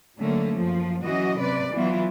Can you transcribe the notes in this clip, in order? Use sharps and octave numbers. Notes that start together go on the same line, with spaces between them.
D3 F#3 A3 A#3 C#4
F#2 F3
E3 F#3 C#4 F#4 D#5
C3 B4 D5
E3 F#3 B3 E4 F4